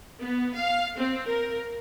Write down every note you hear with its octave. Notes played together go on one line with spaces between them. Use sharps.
B3
F5
C4
A#4